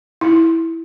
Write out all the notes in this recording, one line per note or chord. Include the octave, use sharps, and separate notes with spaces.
E4